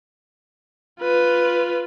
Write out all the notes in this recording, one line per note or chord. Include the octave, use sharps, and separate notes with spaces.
F4 B4